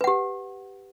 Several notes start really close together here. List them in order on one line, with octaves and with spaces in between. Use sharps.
B4 F#5 G4